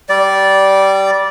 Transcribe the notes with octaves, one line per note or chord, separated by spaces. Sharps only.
G3 D5